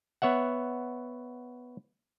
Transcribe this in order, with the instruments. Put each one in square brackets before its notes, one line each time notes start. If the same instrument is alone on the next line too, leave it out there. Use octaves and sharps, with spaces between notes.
[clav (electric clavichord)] B3 C#5 E5 F#5